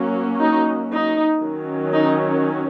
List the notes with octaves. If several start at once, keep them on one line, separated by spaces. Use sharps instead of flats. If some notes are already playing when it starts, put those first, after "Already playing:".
Already playing: F#3 A#3 C#4
D#4
D#4
D#3 F#3 C#4
D#4